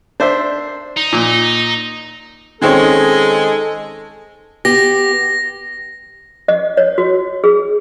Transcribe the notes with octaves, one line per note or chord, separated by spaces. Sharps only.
D4 C5 E5
D#4
A#2
D#3 G#3 C4 C#4 G#4 A4
B3 G4 A#6
D#5
C#5
F#4
G#4